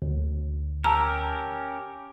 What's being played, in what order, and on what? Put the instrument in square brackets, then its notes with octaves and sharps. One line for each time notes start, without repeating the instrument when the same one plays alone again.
[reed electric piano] D2
[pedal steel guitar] C#4 G4 A#4 [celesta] A5 E6 F6 [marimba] A#5